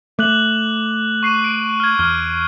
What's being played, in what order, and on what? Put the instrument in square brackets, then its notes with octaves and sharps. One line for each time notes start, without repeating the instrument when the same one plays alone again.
[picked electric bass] A3 [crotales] D6 F#6 F#7
[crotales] C#6 C7 D#7
D7
F6 G#6
[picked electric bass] E2 [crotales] F6